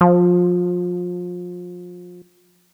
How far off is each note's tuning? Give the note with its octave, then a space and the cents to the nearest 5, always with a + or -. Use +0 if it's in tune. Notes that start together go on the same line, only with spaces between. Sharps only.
F3 +30